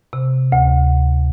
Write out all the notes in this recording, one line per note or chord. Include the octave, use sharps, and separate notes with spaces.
C3
D2